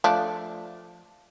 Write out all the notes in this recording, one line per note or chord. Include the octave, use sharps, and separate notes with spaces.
F3 A3 D4